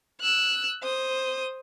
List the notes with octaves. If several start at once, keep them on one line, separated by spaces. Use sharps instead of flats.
E6 F#6
C5 D#6